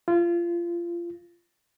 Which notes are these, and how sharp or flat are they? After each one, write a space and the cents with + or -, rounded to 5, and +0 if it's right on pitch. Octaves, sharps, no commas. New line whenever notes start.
F4 -25